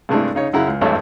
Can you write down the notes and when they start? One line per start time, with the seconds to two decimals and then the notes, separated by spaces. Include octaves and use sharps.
0.09 G2 C3 G#3 A3 D4 E4
0.35 C#3 D#4 C#5
0.53 F#2 C#3 E4 F#5 A#5
0.67 C#2
0.81 G#1 E2 G2 A3 A4 C#5